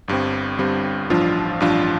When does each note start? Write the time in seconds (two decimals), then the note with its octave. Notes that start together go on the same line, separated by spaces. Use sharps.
0.08 G1 G2 G3 C4
0.58 G1 G2 G3 C4
1.10 A1 G2 F3 D4 F4
1.60 A1 G2 F3 D4 F4